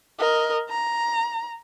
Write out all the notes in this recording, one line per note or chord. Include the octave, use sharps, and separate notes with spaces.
A#4 D#5
A#5